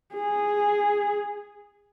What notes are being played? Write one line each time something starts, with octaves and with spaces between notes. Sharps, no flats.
G#4